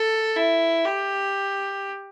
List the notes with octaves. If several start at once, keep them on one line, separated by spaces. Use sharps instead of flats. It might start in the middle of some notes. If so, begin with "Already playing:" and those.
Already playing: A4
E4
G4